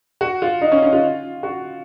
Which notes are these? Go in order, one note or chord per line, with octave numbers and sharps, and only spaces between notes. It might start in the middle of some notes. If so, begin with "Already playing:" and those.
F#4
F4
D#4
C#4
C#4
F4
F#4